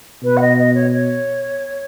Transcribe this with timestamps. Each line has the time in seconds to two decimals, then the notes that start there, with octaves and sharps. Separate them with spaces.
0.23 B2 B4
0.36 F#5
0.41 D#5
0.58 D#5
0.74 C#5
0.92 C#5